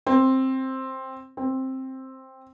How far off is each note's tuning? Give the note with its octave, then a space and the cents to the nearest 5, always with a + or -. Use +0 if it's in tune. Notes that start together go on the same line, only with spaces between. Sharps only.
C4 +10
C4 +10